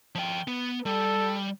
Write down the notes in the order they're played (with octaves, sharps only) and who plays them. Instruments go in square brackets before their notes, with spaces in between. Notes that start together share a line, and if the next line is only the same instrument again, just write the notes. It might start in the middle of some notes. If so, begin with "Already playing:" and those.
[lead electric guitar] F3 G5
B3
[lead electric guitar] G3 [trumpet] A4